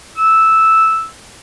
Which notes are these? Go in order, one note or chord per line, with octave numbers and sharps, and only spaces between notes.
E6